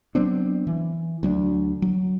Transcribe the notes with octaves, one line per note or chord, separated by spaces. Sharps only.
F#3 B3 C4 D4
E3
D2 F#3 D4
F#3